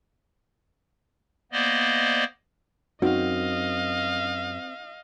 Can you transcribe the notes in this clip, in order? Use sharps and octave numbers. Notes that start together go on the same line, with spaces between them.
A#3 B3 C5 D5 D#5
F#2 C4 D#4 F#4 D#5 F5